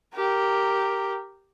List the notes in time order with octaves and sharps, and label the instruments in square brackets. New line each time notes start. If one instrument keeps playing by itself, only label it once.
[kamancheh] G4 A#4